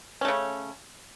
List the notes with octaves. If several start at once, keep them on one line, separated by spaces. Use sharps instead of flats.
C#3 A3 C#4